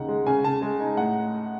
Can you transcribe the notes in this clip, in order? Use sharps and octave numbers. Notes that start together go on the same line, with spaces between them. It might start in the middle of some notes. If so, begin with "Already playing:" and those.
Already playing: D#2 C#3 D#4 F#5
G#3
C#3 G#5
C#3 A5
G#3
D#4
A2 F#5